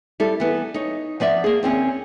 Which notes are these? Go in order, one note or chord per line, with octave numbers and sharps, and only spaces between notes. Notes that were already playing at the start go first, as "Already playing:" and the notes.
G3 E4 A4
E3 B3
D#4 C#5
F3 B3 D5 E5
A#3 G#4
D#2 C4 C#4